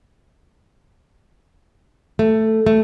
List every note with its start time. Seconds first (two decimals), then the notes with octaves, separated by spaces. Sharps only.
2.19 A3
2.66 A3